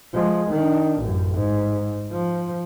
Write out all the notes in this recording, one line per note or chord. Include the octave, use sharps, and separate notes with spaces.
F3 G#3
D#3 D4
A1 F#2
G#2
F3